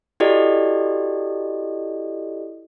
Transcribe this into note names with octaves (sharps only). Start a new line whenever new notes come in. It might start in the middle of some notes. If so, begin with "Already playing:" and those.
E4 F#4 G4 A4 D5 D#5